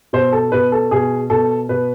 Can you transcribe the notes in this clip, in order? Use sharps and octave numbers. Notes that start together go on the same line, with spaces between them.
B2 C5
A4
B2 B4
A4
B2 G#4
B2 A4
B2 B4